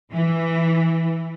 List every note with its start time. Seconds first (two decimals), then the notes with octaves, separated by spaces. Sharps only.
0.12 E3